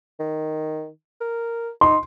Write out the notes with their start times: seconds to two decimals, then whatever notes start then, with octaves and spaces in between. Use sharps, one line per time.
0.20 D#3
1.21 A#4
1.81 D#4 C6